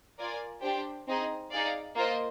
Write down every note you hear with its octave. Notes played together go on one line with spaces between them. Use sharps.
F4 A#4 D5 G#5
D4 G4 C5 G5
C4 D#4 G#4 D#5
D#4 G#4 D5 F5
A#3 F4 C5 D#5